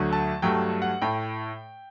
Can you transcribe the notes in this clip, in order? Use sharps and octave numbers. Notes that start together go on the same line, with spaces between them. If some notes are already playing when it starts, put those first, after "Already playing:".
Already playing: D2 D3 F#3 A3
A5
G2 F#3 A3 G5
F#5
A2 G5